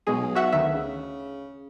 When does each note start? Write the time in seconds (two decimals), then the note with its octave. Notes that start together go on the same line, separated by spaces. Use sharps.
0.07 B1 B2 G#3 G#4
0.35 F#4 E5 F#5
0.52 D2 D#3 E5
0.74 C#3